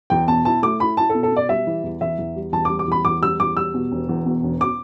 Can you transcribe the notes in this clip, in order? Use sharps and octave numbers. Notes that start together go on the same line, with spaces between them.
E2 G5
B2 A5
E4 A5
A3 D6
E4 B5
E4 A5
A4
B2
A4
B2 D5
G3 E5
E3
E2
E2 E5
E2
G3
E2 A5
D6
G3
D6
E2 B5
E2 D6
G3 E6
E2 D6
G3 E6
B2
E1
E2
B2
E1
D6